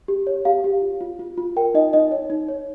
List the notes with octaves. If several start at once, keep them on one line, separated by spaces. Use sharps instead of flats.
G4
C#5
G4 F5
G4
F4
F4
F4
F4
A#4 G5
D#4 D#5
D#4 D#5
C#5
D#4
C#5